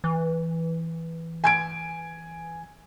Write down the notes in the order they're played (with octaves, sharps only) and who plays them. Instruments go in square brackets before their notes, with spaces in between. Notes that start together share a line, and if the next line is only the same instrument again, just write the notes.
[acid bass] E3
[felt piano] G#5 G#6 D7